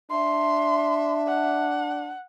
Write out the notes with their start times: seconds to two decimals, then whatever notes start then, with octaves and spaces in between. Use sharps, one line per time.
0.11 D4 E5 C6
1.27 F#5